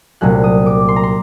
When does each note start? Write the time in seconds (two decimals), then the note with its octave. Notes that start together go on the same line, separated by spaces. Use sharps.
0.21 C2 A#2 F#3 A3 F#6
0.44 D#6
0.66 D6
0.89 C6
0.96 A#5
1.03 C6